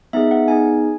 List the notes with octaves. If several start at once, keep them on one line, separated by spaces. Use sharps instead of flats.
B3 D#4 G#4 E5
F#5
B3 D#4 G#4 G#5